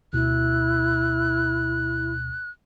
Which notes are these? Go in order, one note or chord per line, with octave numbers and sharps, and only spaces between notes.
D2 B2 E4 F#6